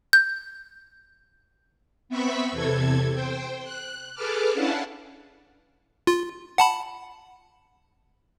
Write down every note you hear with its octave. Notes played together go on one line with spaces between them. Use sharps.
G6
B3 C4 E5 B5 C#6 B6
E2 C3 A4 G#6
C5 G5
F#6
G#4 A4 B4 A5 D6 F6
C#4 D4 E4 F5 F#5 A5
F4
F#5 A5 B5